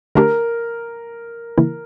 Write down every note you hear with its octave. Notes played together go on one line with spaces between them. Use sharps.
D3 A3 D4 G4 A#4
C#3 E3 A#3 E4